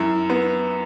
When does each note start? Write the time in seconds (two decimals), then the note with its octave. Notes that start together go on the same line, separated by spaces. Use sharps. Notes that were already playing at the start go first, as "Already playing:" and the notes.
Already playing: F#2 E4
0.30 B3